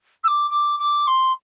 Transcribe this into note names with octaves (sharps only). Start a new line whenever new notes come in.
E6
D6
D6
D6
C6